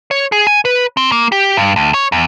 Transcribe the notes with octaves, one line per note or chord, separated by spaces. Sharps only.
C#5
G#4
G#5
B4
C4
A#3
G4
G2
D2
C#5
E2